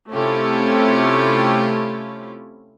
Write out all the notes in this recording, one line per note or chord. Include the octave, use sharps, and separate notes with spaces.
C3 A3 C#4 E4 F4 G4